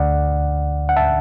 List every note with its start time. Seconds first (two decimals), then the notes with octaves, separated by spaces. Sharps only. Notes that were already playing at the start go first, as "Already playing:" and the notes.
Already playing: D2 D3 D5 F#5
0.89 F#5
0.96 E5 A5